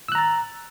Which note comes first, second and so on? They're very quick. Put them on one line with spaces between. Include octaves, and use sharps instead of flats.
E6 F#6 A#5 A6